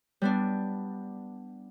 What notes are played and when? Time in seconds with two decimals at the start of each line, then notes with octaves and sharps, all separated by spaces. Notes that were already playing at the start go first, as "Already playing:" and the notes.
0.22 G3 B3 D4